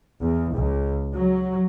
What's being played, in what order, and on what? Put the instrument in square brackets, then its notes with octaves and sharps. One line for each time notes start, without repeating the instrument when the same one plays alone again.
[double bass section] E2
C#2
F#3